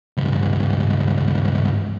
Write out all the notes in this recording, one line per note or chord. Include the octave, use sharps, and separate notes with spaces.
C#2 G2